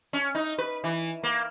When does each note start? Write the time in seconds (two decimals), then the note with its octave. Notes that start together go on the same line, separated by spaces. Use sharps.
0.13 C#4
0.35 D#4
0.58 B4
0.84 E3
1.23 A#3